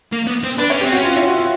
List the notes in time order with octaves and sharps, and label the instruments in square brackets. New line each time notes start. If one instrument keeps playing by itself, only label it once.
[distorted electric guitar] A#3
B3
C4
[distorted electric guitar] D4 [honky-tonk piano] B4
[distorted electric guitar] C#4 [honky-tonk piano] C#5
[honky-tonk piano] G4
[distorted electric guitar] C4
[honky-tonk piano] F#4
[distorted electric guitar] C#4
[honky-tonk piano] F4
E4
F#4
F4